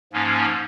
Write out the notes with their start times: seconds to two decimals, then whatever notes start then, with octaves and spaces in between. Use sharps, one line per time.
0.13 G#2 F3 A#3 C#4